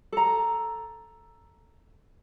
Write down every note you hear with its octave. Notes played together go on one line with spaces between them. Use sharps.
A4 A#5